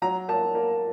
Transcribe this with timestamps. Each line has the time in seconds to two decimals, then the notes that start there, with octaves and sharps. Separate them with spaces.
0.02 F#3 A#5
0.28 A#3 A5
0.55 A#3